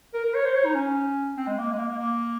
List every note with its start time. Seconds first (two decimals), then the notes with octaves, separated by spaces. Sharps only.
0.14 A#4
0.24 A#4
0.34 C#5
0.45 C5
0.54 C#5
0.65 D#4
0.75 C#4
1.37 C4
1.47 G#3
1.58 A#3
1.72 G#3
1.78 A#3
1.88 A#3
1.99 A#3